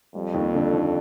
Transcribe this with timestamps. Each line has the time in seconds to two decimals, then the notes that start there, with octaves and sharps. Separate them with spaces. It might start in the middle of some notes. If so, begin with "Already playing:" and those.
0.15 F2 G3
0.34 D#2
0.55 D3
0.74 D#2